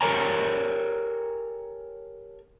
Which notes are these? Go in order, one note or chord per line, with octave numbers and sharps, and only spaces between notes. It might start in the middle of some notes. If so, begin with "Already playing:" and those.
G4 A4 A#4 C#5 G#5 A#5